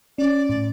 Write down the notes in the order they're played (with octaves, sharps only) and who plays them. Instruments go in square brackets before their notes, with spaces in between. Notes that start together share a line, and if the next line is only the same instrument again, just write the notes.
[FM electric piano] C#4 [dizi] D5
[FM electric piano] A2